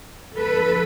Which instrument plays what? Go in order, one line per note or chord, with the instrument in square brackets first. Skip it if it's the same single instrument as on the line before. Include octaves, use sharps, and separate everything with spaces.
[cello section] D3 F3 A#3 A4 B4